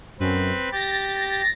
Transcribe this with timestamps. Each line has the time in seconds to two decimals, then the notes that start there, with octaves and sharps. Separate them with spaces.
0.20 F#2 C4 B4
0.72 G4 A6 A#6